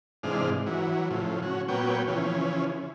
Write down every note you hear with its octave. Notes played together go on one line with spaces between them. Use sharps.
G#2 C3 E3 G#3 D4 F5
E3 F#3
A2 C#3 F3
C#4 F#4
A#2 F#3 B3 C#5 G5
C#3 E3 F3 C#4